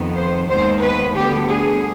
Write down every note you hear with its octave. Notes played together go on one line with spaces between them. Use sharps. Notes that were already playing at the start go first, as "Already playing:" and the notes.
Already playing: F2 D#3 B3
C5
D#2 D#3 G#3 B3 C5
B4
D2 D3 G3 B3 G4
G#4